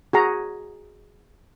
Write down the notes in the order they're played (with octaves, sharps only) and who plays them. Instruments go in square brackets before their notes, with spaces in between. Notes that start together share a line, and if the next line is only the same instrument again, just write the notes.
[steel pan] F#4 G#4 A#5